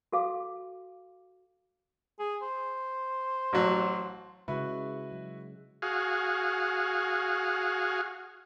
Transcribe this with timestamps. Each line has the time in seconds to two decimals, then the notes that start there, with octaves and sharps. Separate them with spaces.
0.12 F#4 A4 F5 D6
2.19 G#4
2.42 C5
3.53 A1 F#3
4.48 C#3 G#3 C#4 E4 F#4 B4
5.12 F#3
5.82 F#4 G#4 F5